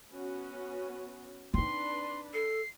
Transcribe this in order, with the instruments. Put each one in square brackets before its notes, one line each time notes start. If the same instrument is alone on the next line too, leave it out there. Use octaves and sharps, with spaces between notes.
[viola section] B3 C#4 F#4
[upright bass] C4 D#4 [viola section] D4 B4 D5 [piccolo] C6
[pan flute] A4 [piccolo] C7